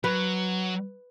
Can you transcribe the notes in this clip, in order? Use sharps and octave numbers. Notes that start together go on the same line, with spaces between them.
F#3 B4